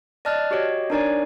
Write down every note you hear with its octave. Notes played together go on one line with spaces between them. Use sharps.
D5 D#5 A5 F6 F#6 A6
F#4 G4 C#5 D#5
D4 D#4 A#4 C#5 D5 G#5